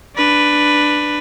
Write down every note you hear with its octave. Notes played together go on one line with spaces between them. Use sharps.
D4 B4